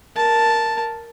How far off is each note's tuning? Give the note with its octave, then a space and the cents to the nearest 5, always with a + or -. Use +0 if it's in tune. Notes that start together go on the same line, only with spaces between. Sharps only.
A#4 +0 A5 +0